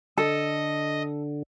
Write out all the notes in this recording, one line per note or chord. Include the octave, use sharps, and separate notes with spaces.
D3 A4 D#5